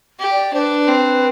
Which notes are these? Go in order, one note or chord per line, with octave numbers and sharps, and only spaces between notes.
G4
D5
D4 B4 C5
C4